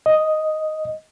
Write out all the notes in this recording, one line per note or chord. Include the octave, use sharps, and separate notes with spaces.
D#5